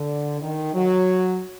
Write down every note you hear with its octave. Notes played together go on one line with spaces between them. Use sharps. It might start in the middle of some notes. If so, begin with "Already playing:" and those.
Already playing: D3
D#3
F#3